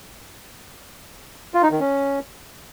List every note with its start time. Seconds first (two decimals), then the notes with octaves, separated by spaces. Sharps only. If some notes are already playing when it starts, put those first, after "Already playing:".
1.54 F4
1.63 D#4
1.71 D#3
1.80 C#4